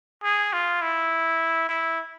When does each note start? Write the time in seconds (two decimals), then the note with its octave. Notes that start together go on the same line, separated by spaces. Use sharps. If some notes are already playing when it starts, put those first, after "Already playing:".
0.24 G#4
0.53 F4
0.82 E4
1.69 E4